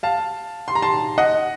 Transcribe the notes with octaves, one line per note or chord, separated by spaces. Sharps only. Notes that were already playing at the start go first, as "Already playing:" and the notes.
F5 A5
C6
A#5
A5 C6
D#5 F#5